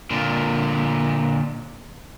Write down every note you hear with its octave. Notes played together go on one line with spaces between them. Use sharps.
A#2 D3